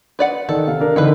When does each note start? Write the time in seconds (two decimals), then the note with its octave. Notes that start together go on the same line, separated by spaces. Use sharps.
0.19 B4 D5 F#5
0.49 D#3 A4
0.67 C3 F5
0.81 D4 A#4
0.96 D3 D#3 C4 E4 B4